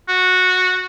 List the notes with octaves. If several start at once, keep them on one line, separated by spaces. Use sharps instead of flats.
F#4